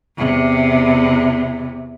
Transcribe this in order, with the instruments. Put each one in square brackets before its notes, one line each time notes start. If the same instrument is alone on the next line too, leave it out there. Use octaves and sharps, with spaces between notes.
[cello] E2 C3